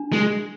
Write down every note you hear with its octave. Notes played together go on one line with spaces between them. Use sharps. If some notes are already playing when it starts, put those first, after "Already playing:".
Already playing: D4
G#3